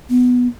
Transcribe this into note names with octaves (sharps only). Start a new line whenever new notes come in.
B3